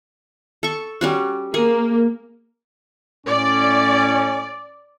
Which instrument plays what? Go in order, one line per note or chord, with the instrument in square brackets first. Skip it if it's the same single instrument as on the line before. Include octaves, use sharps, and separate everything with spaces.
[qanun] A4 C#6
G3 C#4 F#4
[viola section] A#3 [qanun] G#4
[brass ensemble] A2 C#4 [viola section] D5